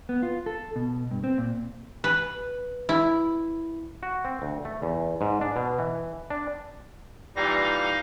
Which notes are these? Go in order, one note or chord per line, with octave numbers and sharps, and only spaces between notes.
B3
F4
A4
B2
G2
C4
A#2
B4
E4
F#4
C4
D2
A3
E2
G#2
D4
B2
E3
D4
A#2 E3 G3 D#4 F5 A#6